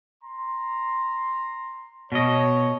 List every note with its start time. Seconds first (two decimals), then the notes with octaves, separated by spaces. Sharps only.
0.23 A#5 C6
2.12 B2 C#5 D#5